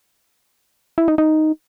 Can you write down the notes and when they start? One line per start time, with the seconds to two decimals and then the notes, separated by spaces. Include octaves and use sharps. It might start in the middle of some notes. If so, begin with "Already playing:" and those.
0.98 E4
1.08 D#4
1.18 D#4